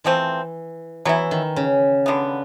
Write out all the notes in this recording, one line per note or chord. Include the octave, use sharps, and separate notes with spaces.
E3 F3 A3 C4
E3 F#3 B3 E4
D#3
C#3
D3 G3 B3